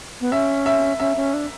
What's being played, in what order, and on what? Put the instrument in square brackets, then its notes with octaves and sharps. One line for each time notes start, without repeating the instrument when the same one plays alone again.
[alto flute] B3
[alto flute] C#4 [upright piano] E5
[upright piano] E5
[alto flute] C#4 [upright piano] E5
[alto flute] C#4
D4